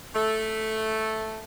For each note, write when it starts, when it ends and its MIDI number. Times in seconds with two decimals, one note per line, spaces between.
0.15 1.43 57